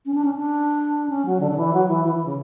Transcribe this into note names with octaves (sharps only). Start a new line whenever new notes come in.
C#4
D4
C#4
D4
C#4
F#3
D3
D3
E3
F#3
E3
E3
E3
C#3